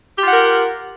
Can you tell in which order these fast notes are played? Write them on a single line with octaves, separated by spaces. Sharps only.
G4 F4 F#5 A#4